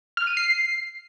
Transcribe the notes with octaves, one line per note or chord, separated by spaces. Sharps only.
F6
D#7
C7